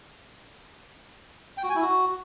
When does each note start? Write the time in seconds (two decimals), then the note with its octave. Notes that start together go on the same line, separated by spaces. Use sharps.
1.57 G5
1.63 F#4
1.69 G#5
1.76 E4
1.82 F#4